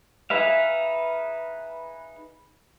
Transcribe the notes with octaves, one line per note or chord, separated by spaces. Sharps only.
D#4 G#4 B4 E5 F5